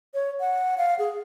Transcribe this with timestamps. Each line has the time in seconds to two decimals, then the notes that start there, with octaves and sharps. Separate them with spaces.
0.14 C#5
0.40 F#5
0.78 F5
0.99 G#4